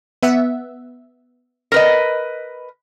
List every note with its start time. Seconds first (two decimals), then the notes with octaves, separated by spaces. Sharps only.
0.23 B3 E5 F#5
1.72 A#4 B4 D#5